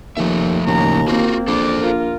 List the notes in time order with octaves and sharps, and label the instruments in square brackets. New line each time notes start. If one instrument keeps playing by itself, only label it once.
[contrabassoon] D#2 [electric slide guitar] F3 A3 E5
[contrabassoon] D#2 [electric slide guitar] A2 C#3 F3 [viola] A#5
[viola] A#3 C4 [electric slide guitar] F4 F#4
[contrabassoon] A#1 [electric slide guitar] A4 C5 [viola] D5
[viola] F4 A#4